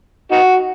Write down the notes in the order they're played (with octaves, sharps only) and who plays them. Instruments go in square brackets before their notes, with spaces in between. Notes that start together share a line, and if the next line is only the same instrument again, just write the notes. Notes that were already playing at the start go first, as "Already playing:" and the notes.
[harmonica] D#4 F#4